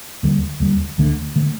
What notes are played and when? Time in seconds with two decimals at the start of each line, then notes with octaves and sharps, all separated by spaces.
0.23 D#2 D3 G3
0.60 D#2 D3 G3
0.98 D2 D3 A3
1.36 D3 A3